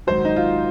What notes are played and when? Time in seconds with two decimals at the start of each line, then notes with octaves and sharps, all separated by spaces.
0.07 G#1 G#2 F#3 C5
0.25 D#4
0.36 F4